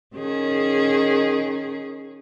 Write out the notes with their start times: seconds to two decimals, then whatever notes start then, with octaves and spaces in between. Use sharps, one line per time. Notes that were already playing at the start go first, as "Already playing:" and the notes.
0.16 D#3 C#4 G#4